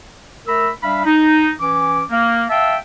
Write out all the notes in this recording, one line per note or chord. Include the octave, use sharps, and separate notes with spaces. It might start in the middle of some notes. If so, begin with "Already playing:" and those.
A3 A#4 B5 E6
G3 D4 E5 F5 B5
D#4
E3 C#4 D6
A#3
E5 F5 G5 A5 E6